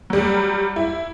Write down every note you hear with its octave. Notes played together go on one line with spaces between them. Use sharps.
F#3 G3
E4